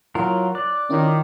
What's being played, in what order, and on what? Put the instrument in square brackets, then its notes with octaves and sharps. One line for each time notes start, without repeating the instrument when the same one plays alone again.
[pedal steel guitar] F#3 F4 A#4 [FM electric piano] E4 C#5 F#5
[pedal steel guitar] D5 [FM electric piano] F#6
[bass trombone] D#3 [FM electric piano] C#4 E4 F4